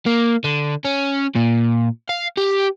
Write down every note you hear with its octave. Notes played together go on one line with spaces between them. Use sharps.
A#3
D3
C#4
A#2
F5
G4